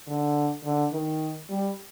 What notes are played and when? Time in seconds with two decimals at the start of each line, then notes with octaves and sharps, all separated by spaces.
0.08 D3
0.64 D3
0.92 D#3
1.50 G3